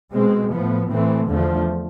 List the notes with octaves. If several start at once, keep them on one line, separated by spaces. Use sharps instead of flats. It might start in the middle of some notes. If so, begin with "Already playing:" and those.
B2 G#3 C4
A2 F3 B3
A2 E3 A3 C4
E2 D3 F3 A3